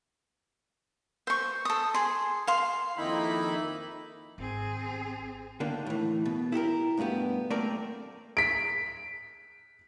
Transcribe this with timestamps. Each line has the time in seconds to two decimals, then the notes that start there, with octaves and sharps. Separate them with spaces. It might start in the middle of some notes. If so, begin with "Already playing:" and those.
1.27 C5 C#6
1.65 A4 D#6
1.94 G#4 C6
2.47 F5 C6
2.97 F2 D#3 A#3 D#4 E4 B5
4.38 G#1 C4 G#4
5.60 D3 D#3 A#3 D4
5.86 A2 E3
6.25 B2
6.52 E4 G4 A4 A#4
6.97 B1 G2 A3 B3 G4
7.50 A3 A#3 C4 A#4 D5
8.37 B6 D7